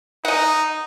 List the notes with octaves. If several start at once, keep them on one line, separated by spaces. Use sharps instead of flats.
D#4 D#5 F#5